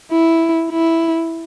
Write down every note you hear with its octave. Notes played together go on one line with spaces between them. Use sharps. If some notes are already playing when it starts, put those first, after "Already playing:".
E4
E4